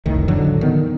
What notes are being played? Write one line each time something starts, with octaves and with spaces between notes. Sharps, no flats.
F1 C2 A2 D#3
A2 D3 F3 F#3
D#3 B3